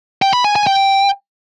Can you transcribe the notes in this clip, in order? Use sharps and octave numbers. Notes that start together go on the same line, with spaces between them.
G5
B5
G#5
G#5
G5